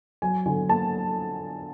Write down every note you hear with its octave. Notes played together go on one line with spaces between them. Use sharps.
F#3 G#5
D3 G#5
A#3 A5